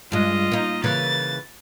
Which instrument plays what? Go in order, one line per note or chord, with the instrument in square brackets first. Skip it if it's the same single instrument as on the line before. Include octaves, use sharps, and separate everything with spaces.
[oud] G2 G#3 [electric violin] F4 D#5
[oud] A#3 D#4
[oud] C#3 E3 A#3 [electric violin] A6